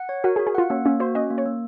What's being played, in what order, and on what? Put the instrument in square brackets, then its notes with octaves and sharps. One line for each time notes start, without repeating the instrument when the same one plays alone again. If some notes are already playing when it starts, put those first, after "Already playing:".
Already playing: [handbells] F#5
C#5
[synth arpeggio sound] F#4 [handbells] A#4
[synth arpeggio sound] G#4
[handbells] F#4
[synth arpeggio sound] G#4
[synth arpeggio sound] F4 [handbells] F#5
[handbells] A#3 [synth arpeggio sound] C#4
[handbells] A#3 [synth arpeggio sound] C#4
[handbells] F#4 [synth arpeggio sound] C5
[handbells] C#4 [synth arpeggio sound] D#5
[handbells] A#3
[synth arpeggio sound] C#5
[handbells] A#3